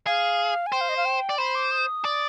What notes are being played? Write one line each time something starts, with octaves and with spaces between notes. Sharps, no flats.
G#4 F5
G#5
C5 G5
F5
D#5
F5
G5
D5
C5 B5
D6
D#6
D5